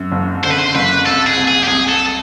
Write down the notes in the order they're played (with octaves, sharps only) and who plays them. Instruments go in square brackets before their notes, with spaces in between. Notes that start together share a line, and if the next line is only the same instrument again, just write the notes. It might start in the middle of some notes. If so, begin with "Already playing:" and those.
Already playing: [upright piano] F#2
F#1
[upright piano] D3 [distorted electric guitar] C5
[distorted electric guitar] B4
C5
[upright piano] F#1 [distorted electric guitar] B4
[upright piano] C2 [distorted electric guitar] A4
[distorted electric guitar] G#4
[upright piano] C2
[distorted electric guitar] G#4
G4
[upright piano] C2 [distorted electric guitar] G#4
[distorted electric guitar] A4